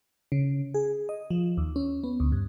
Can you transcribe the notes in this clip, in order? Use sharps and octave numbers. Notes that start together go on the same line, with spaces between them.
C#3
G#4
D#5
F3
D#2
C#4
B3
D2
G2